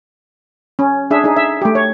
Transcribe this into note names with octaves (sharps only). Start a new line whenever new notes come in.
C#4
D4 G#4 E5
D#4 G#4
E5
A3 G4
C#5